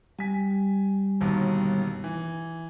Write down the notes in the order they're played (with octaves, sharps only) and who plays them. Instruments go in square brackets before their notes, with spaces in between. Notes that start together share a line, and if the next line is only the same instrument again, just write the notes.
[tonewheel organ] G3 [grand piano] G#5 B6
[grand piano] G1 D#2 B2
E3